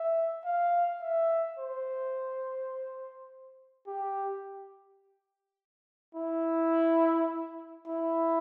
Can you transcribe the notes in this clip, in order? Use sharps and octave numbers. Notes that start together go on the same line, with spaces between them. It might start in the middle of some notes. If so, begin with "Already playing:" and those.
Already playing: E5
F5
E5
C5
G4
E4
E4